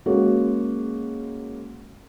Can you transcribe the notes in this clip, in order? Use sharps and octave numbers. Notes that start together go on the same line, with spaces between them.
G#3 A#3 C#4 F#4